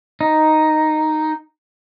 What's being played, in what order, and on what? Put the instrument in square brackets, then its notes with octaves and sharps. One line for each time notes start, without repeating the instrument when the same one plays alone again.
[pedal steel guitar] D#4